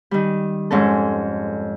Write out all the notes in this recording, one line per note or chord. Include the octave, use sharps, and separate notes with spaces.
D#3 G3
F2 G#2 C#4 A4